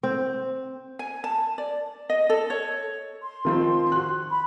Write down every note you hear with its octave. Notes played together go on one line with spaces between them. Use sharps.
C4
G#5
A5
D5
D#5
A4
C#5
C6
D#3 F3 C4
F#4 F#6
B5